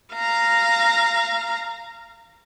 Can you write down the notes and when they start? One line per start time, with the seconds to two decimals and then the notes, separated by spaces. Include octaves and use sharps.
0.14 F5 A#5